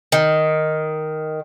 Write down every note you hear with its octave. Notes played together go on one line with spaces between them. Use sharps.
D#3